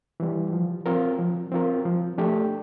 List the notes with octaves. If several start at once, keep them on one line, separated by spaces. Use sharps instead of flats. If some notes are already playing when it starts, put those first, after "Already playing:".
E3 G3
F3
C4 F4 A#4
F3
C4 F4 A#4
F3
A3 D4 G4